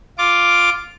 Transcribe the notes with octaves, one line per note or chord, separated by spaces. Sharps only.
F4 D6